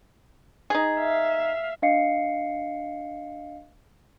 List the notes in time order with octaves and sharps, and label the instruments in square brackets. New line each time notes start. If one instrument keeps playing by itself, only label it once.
[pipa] D#4 G#4
[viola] E5 F5
[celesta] D4 D#5 F5 C7 C#7